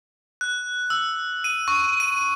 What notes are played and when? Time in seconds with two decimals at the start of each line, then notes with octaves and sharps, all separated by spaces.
0.41 F#6
0.90 E6
1.44 D#7
1.68 C#6
2.00 D#7